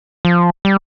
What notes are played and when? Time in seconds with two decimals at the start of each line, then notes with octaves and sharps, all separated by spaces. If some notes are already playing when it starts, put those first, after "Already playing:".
0.25 F3
0.65 G3